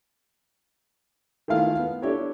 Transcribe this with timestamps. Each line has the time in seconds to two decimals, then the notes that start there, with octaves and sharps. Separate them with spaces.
1.48 D#3 E3 A3 E4 F4 F5
1.77 B3
2.02 D4 E4 G4 A4 C#5